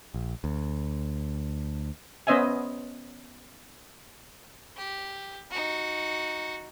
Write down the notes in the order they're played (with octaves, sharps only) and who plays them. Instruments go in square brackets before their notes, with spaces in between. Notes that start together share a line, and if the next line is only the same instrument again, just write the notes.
[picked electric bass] A#1
D2
[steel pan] B3 C#4 C5 D#5 E5 G#5
[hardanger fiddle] G4
D#4 F#4